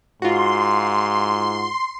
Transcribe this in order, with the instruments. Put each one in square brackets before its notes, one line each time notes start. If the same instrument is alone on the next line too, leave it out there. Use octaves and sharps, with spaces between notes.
[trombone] G#2 [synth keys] F4 F#4 [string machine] C6